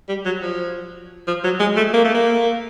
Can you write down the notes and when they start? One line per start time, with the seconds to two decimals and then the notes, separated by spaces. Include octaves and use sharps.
0.08 G3
0.25 F#3
0.43 F3
1.27 F3
1.44 F#3
1.60 G#3
1.77 A3
1.94 A#3
2.05 A3
2.14 A#3